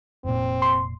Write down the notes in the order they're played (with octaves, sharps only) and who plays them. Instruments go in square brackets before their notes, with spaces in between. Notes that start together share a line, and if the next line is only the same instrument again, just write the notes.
[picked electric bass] F1 A#2 [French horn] C4
[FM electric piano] C6